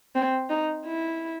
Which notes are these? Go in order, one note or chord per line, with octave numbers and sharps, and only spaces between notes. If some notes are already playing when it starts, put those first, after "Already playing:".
C4
D#4
E4